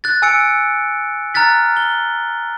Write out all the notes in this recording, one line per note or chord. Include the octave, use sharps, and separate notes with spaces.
F#6 A6
G#5 E6 C#7 D7
A#5 F6 F#6 A6 B6
G7